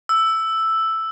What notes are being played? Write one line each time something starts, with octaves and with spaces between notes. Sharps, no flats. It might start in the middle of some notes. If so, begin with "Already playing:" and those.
E6